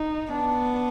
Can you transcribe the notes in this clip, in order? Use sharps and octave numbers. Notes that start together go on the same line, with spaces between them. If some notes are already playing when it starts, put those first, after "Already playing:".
Already playing: D#4
B3 D4